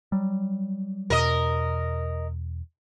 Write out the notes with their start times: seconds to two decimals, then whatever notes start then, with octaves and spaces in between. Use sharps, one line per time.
0.12 F#3 G3
1.10 E2 B2 A#4 D#5